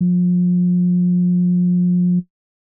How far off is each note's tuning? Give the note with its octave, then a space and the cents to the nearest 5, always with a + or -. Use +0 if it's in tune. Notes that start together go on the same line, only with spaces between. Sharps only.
F3 +35